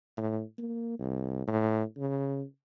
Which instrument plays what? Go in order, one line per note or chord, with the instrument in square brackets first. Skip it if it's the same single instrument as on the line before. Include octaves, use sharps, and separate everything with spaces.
[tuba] A2
A#3
C2
A2
C#3